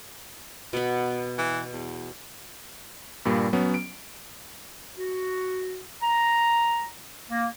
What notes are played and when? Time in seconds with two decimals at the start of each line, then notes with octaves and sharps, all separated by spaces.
0.73 B2 B3 B5
1.38 E3
1.73 E2
3.25 G2 A#2 G3 A#3
3.53 F#3 B3 C#4
3.74 D7
4.97 F#4
6.02 A#5
7.29 A#3